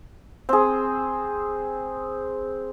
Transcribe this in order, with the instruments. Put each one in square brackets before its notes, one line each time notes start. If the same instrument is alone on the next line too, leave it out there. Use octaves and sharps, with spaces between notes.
[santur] C4 G#4